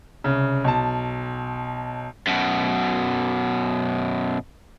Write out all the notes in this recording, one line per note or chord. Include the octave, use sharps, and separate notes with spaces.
C2 C#3
B1 A5
F#2 B2